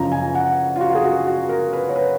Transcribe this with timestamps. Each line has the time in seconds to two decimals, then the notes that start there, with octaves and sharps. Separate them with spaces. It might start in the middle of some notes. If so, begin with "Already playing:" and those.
Already playing: F#1 F#2 F3 A#5
0.12 G#5
0.35 F#5
0.76 F4
0.81 F#4
0.95 G#4
1.04 F#4
1.27 F#4
1.49 A#4
1.73 B4
1.89 C#5
1.96 B4